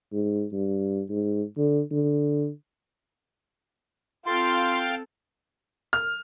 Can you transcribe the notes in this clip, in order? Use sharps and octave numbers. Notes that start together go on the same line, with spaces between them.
G#2
G2
G#2
D3
D3
C4 F4 A4 F5 G5 C6 A6
F6